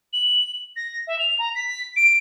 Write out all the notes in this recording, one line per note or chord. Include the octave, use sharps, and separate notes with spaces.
F#7
A#6
E5
F7
A#5
B6
D7